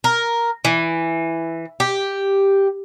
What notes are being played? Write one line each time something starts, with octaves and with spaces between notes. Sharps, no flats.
A#4
E3
G4